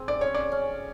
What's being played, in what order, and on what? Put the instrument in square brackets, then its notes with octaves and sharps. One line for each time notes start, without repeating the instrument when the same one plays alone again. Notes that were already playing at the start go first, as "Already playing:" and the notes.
Already playing: [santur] C4 G#4
[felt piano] D5
[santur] C#4 [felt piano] C#5
[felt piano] D5
[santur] C#4